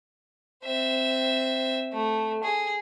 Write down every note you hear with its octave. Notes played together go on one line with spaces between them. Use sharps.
C4 E5
A3
G#4